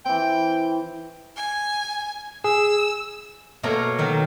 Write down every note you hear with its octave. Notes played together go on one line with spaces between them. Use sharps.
E3 C4 G5
G#5
G#4 E6
B2 A3 A#3 C#5 A#5
D#3 F#3